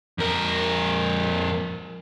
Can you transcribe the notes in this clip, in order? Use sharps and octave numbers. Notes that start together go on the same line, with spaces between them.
F2 A#4